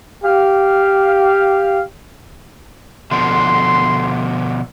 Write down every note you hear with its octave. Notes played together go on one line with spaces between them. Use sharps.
G4 F5
B2 D3 F3 C6